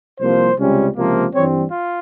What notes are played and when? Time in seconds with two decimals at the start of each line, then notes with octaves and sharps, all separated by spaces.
0.19 C2 C3 F3 A#3 C5
0.57 C#2 C3 G3 C#4
0.95 C#2 C3 F3 A#3
1.33 G2 E3 G3 C4 C#5
1.71 F4